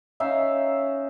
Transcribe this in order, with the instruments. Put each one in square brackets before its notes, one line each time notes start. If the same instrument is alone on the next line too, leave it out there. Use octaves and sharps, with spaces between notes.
[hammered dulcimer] C#4 D#4 E5 F5